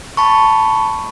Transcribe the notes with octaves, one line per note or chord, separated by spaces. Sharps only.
A5 B5 C#6